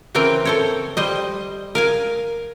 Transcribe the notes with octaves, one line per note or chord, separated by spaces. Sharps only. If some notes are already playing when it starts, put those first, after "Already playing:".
C#3 E3 C4 A#4 G5 A#5
A4 C5 C#5
G3 C5 D#5
A#4 F5 G#5